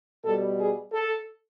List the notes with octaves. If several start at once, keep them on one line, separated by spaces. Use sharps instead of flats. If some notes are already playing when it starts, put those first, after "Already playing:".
B2 G3 A4
G#4
A4